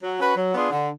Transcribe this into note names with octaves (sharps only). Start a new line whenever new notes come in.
F#3
C#4 F#4 B4
F#3
B3 D4 F4 G#4
D3